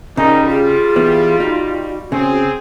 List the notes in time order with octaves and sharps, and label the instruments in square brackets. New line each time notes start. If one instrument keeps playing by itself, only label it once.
[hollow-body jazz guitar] C#3 [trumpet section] G3 [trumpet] D#4 [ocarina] A#4
[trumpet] F4 [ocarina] G#4
[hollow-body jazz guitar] E3 B3
[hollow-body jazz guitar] D#4 [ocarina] F#4
[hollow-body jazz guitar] C#3 [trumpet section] C4 G#4